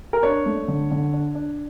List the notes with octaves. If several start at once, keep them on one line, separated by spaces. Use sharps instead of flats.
A#4
D4 C#5
A3
D3
D3
D4
D4